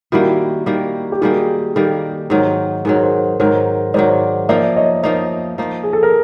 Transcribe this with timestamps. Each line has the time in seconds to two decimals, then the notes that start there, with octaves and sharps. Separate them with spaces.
0.12 D#3 G3 A#3 E4 F#4
0.66 D#3 G3 A#3
1.12 G4
1.21 D#3 G3 A#3 F#4 G#4
1.76 D#3 G3 A#3 G4 A4
2.30 G#2 D#3 F#3
2.85 G#2 D#3 F#3 G#4 A#4
3.03 A#4 C5
3.40 G#2 D#3 F#3 A#4 C5
3.94 G#2 D#3 F#3 C5 D5
4.49 F3 A#3 D#4 D5 E5
4.76 C#5 D#5
5.03 F3 A#3 D#4 C#5 D#5
5.58 F3 A#3 D#4
5.83 G#4
5.93 A4
6.03 A#4